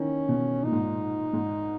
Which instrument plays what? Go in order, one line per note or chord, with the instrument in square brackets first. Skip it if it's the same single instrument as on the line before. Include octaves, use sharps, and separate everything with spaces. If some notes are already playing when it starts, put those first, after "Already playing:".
Already playing: [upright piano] D#3 E3 [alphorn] C#4
[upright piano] B2
[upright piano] A#2 [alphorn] D#4
[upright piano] G#2
A#2
G#2